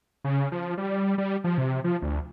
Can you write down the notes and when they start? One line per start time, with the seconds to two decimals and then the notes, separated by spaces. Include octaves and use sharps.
0.24 C#3
0.52 F3
0.78 G3
1.18 G3
1.44 F3
1.58 C3
1.84 F3
2.02 D2